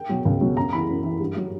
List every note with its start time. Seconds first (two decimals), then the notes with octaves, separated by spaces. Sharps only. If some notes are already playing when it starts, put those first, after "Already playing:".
Already playing: G5
0.09 B2 F#3
0.25 C#2
0.41 B2 F#3
0.56 F#2 A#5
0.73 E3 B5
0.89 F#2
1.04 E3
1.20 G2
1.36 F#3